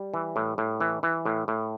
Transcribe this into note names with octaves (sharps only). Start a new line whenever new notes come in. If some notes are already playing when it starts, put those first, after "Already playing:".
Already playing: G3
E3
A2
A2
E3
E3
A2
A2